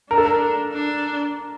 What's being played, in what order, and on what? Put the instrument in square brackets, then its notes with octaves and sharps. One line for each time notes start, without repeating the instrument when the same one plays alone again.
[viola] D4 [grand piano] A#4
[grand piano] A4
A#4
[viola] D4